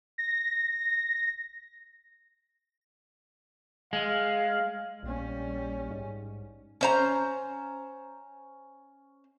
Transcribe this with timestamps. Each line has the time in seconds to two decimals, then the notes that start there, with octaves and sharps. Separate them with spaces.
0.18 A#6
3.93 G#3 F5
5.03 A#1 G3 C#4
5.91 G#2
6.81 C#4 C5 A#5